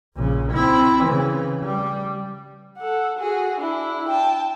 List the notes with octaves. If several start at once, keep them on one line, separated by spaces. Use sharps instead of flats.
A#1 C#3
C4 E4
C#3 E3
G3
A4 F#5
F#4 G#4
D4 E4
G5 A5